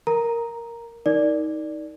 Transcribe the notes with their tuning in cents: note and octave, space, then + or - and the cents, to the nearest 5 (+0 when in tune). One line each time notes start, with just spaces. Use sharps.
A#4 +0 A#5 +0
D#4 +20 A#4 +0 D5 +0